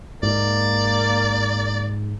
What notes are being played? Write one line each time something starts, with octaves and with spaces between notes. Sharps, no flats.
G#2 A#3 D5